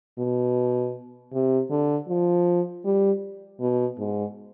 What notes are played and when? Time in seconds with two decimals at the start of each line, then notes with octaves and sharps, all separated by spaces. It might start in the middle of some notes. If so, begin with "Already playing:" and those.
0.19 B2
1.33 C3
1.70 D3
2.08 F3
2.85 G3
3.60 B2
3.98 G#2